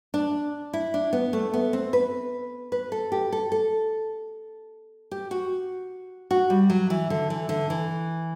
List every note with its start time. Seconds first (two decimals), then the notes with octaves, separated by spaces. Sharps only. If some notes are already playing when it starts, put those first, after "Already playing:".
0.14 D4
0.73 E4
0.94 D4
1.13 B3
1.33 A3
1.53 B3
1.73 C4
1.93 B4
2.72 B4
2.92 A4
3.12 G4
3.32 A4
3.52 A4
5.11 G4
5.31 F#4
6.31 F#4
6.50 G3
6.70 F#3
6.90 E3
7.10 D3
7.30 E3
7.49 D3
7.70 E3